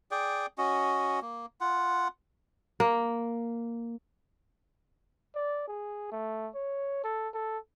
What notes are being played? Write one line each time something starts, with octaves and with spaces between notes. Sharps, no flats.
G#4 D5 G5
C#4 F#4 D#5
A#3
F4 F#5
A#3
D5
G#4
A3
C#5
A4
A4